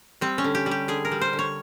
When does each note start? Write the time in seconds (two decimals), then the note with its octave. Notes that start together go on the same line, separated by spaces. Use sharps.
0.21 G3 C4
0.38 C#4
0.44 D3
0.55 G4
0.66 G3
0.71 G4
0.88 D3 G#4
1.05 A#4
1.11 G3
1.21 C5
1.33 D3
1.39 C#5